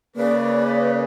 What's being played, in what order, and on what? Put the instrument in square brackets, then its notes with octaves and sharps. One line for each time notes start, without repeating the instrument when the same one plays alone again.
[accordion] C#3 [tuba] A#3 [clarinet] B4 [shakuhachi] D5